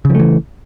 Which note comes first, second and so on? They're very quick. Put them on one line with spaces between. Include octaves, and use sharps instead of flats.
C#3 F3 A3 E3